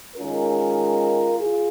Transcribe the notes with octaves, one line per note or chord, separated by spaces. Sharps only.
D#3 G#3 C#4 F4 A#4
F4 G#4